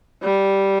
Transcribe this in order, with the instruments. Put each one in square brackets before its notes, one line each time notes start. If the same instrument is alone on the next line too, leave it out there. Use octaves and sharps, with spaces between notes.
[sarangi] G3